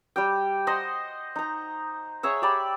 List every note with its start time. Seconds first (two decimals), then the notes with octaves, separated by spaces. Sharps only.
0.16 G3 G4 G5
0.67 C5 D#5 F#5 C6
1.36 D#4 A#5
2.23 G#4 C#5 E5 F#5
2.42 G4 D5 B5